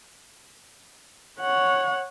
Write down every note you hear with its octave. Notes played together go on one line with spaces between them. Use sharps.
C#5 F#5